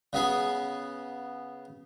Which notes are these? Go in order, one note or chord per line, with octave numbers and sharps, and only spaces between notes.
C#3 B3 G#4